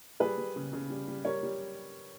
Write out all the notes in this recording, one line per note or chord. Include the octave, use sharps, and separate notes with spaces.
G3 G#4 B4
G3
C#3
C#3
G3
G3
G3 A#4 C#5
G3